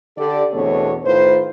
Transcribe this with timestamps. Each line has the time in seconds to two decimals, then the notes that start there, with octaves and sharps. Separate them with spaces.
0.18 D3 D4 G4 A4 D5
0.53 E2 B2 A3 C4 D4 C#5
1.04 A2 D#3 F4 B4 C5